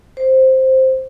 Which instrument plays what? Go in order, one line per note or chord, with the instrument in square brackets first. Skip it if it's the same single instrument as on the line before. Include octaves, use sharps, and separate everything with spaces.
[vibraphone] C5